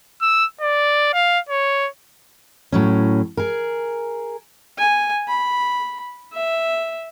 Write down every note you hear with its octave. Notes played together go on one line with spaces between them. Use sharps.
E6
D5
F5
C#5
A2 F#3 C#4
G#4 A#4
G#5
B5
E5